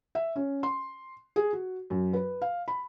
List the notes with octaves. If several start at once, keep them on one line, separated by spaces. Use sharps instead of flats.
E5
C#4
C6
G#4
F#4
F#2
B4
F5
B5